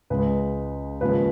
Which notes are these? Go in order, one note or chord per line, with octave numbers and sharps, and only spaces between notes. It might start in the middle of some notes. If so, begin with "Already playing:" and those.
C#2 C#3 G#3 B4
D#2 C#3 F3 G#3 B4